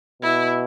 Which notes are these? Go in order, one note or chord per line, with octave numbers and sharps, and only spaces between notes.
B2 E4